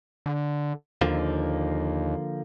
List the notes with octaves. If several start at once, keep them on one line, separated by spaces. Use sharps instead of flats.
D3
D#2 D3 F3 A#3